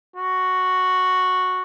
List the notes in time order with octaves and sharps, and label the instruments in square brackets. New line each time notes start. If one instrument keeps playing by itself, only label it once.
[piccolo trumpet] F#4